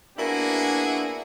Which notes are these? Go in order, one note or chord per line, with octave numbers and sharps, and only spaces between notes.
A#3 B3 D4 E4 F#4 G#4